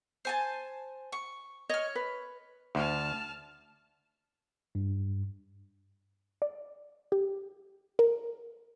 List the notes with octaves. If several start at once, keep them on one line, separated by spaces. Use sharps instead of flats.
C5 G#5 A5
C#6
C#5 D#5 F6
B4
D2 A5 F6
G2
D5
G4
A#4